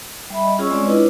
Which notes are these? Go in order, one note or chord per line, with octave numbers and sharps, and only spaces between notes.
G3 E5 B5
D#5
C#4 F4 G#4 C#5 C#6 E6
G#3 C4 F4 C#5 D5
D4 E4 F4 B4 D#5